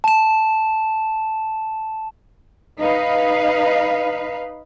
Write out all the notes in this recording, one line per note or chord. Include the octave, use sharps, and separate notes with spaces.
A5 E7
D#4 B4 F5